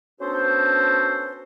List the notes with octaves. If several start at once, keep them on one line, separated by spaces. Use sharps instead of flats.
B3 C#4 D4 F#4 A4 C5